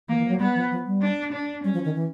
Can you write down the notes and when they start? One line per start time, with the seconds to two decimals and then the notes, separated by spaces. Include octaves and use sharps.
0.08 E3 A#3
0.19 E3
0.25 F3
0.29 F#3
0.40 G3 B3
0.55 F3
0.71 F3
0.86 G3
1.01 D4
1.33 D4
1.64 G3 C#4
1.74 F3
1.85 D#3
1.95 E3